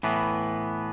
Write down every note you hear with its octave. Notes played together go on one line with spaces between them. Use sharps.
A2 E3 B3